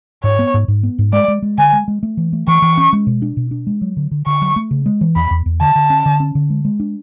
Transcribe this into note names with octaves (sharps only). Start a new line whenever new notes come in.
G#2 C#5
B3
G#2
G#2
B3
G#2
G#3 D5
G#3
G#3
D3 G#5
G#3
G#3
A3
E3
A3
E3 C#6
E3
C#4
G#3
B2
D4
B2
D4
G#3
F#3
D3
D3
D3 C#6
F#3
A3
C#3
G#3
E3
E2 B5
E2
E2
D3 A5
D3
C#4
D3
C#4
D3
G#3
G#3
D4